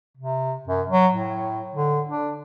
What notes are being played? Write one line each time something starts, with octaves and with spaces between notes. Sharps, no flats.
C3
F#2
F#3
A2
D3
D4